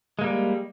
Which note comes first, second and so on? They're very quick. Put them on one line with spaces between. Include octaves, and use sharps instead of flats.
G#3 A#3 G3